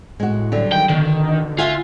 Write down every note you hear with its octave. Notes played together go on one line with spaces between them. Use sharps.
A2 G#3 F#4
D3 F#3 G3
D#3 G5
B2 D3 D#3
F4 E5 F#5 G#5